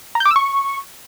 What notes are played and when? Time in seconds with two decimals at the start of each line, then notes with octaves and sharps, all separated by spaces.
0.15 A#5
0.20 G6
0.25 D6
0.31 E6
0.36 C#6